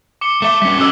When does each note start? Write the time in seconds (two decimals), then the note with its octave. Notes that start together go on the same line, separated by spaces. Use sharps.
0.21 D6 C#7 G7
0.42 A3 E5 D6 G7
0.62 G3 C#4 B6 C#7
0.78 C#4 F#4 A4 D#5 D6 E6